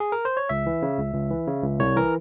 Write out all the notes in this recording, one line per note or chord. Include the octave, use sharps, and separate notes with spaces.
G#4
A#4
C5
C#5
C#2 E5
E3
C#3
C#2
C#2
E3
C#3
C#2
C2 C#5
E3 A#4